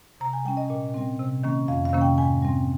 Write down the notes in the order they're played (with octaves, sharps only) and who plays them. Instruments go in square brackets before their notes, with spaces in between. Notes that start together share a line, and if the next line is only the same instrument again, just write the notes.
[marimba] C3 A#5
G#5
G3 C#4 G5
D#5
A#2
G3 C4
C3
D#3 A#3 C#4
F2 F5
F5
C3 D#3 A#3 C#4
G5
G#2 G#5
G3 C4